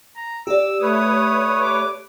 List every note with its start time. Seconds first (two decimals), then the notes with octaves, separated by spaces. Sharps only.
0.15 A#5
0.47 G4 D5 E6
0.81 A3 B4 C#5 D#6
1.62 D6